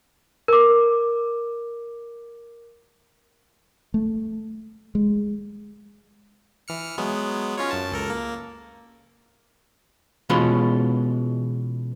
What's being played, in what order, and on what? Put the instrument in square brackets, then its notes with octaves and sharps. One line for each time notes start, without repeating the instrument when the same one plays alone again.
[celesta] A#4 D6
[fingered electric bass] A3
G#3
[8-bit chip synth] E3 F6 C#7
F#3 G#3 B3
C#4 F4 C#5
F#2 A5
C#2 A4 A#4
A#3
[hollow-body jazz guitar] B2 E3 G#3 C#4 F4 C6